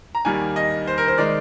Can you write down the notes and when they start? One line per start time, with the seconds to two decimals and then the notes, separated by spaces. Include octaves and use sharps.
0.15 A#5
0.25 D#2 D#3 G3 A#3 G#5
0.56 D#5
0.87 C5
0.98 A#4
1.08 C5
1.18 D#3 G#3 D5